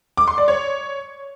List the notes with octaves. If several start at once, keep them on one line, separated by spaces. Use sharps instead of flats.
D6
C6
D5
C#5